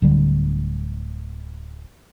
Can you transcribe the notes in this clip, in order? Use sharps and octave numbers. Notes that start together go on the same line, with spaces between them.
D1 D3 G3